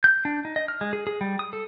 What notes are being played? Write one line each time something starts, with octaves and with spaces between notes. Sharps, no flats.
G6
D4
D#4
D#5
F6
G#3
G#4
G#4
G3
D#6
A4